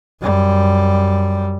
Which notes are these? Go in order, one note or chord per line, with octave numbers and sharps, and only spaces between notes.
F#2 G3